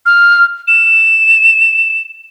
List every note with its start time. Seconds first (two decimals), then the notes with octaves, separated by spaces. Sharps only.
0.06 F6
0.68 E7